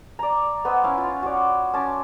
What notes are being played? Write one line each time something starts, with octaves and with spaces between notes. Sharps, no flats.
D5 A#5
B3 C5 D#5 E6
C#4 E4 E5 F5
F4
F#4 C#5 D5
C#4 A5 C6 D6